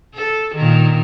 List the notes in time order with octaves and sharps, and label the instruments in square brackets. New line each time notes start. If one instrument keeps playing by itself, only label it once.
[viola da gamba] A4
A#2 D#3